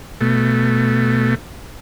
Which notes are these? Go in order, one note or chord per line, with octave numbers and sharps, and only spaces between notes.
B2 A3